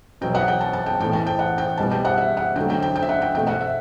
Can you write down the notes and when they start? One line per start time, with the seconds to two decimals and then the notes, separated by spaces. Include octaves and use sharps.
0.21 B2 F#3 B3 G5
0.35 F#5
0.48 G5
0.61 A5
0.73 A5
0.86 G5
1.00 A2 E3 A3 G5
1.13 A5
1.27 G5
1.39 F#5
1.58 G5
1.78 B2 G3 B3 A5
1.92 G5
2.05 F#5
2.18 E5
2.37 F#5
2.56 D3 G5
2.59 F#3 A3
2.70 G5
2.82 G5
2.96 G5
3.02 E5
3.09 F#5
3.22 G5
3.34 B2 A3 G5
3.47 F#5
3.61 E5